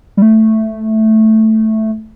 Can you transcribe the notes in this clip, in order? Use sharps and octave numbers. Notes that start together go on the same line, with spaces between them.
G3
A3